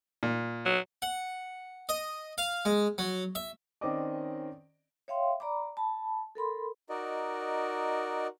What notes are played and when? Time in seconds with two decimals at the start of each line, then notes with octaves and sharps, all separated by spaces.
0.23 A#2
0.65 F#3
1.02 F#5
1.89 D#5
2.38 F5
2.65 G#3
2.98 F#3
3.35 E5
3.81 D#3 C4 C#4 D5 D#5 D6
5.08 C#5 E5 F5 G5 C6
5.40 D5 A#5 B5 D6
5.77 A5 B5
6.35 A4 A#4 B5 C6
6.89 D#4 F#4 A#4 D5 D#5